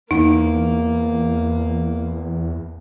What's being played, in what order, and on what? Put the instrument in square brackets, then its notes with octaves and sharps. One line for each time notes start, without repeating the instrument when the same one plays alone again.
[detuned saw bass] E2 [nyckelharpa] A#3 [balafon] D#4